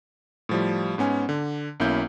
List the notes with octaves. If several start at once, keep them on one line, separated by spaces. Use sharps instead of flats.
A2 F3 G3
G#2 B3 C#4 G#5
D3
B1 A#3 C#4 E4 G6